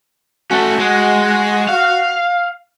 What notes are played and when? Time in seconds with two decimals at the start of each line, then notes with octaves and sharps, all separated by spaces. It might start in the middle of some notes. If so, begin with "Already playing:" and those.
0.51 A3 C#4 F#4
0.79 G#3
1.69 F5